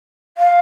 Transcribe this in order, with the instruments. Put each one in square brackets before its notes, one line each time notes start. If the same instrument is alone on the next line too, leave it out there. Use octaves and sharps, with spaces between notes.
[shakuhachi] F5